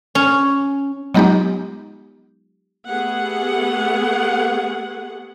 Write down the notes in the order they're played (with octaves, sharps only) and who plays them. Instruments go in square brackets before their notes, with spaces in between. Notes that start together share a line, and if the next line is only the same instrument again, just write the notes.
[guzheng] C#4
[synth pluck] F#3 G#3 B3 D#4 F4 G4
[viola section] A3 B3 G4 G#4 F#5